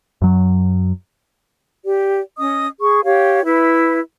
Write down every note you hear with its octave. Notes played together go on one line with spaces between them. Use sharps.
F#2 F#3
G4 D5
C#4 D#5 D#6
G#4 C#6
G4 C#5 F5
E4 B4 E5